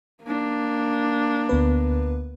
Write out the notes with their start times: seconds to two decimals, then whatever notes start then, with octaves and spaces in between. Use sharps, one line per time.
0.24 A#3 D4
1.49 D2 B3 B4